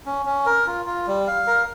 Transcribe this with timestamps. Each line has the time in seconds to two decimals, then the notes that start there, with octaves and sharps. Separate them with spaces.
0.06 C#4
0.26 C#4
0.46 A#4
0.67 F4
0.86 F4
1.07 G3
1.27 F5
1.47 A#4